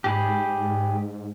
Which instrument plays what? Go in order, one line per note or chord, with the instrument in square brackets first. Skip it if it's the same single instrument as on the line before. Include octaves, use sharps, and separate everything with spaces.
[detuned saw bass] G#2 [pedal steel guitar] G4 G#4 B5